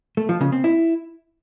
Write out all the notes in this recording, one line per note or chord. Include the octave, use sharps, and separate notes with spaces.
A3
F3
C#3
C4
E4